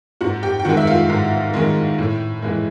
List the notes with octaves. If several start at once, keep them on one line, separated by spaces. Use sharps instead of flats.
G#2 F#4 F#5
G4 G5
G5
D#3 G#3 F#4 F#5
E5
F4 F5
G#2
D#3 G#3
A2
E3 G#3